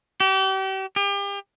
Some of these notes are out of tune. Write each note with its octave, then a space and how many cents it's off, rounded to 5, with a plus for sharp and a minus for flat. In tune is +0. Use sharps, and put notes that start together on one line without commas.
G4 -35
G4 +35